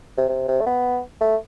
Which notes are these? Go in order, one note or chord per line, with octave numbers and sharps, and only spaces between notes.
C3
C3
C3
A3
B3
A3